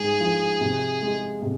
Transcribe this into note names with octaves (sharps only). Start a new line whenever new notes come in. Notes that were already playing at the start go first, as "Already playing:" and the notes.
Already playing: G#2 G#4
F3
C3
G#3
C3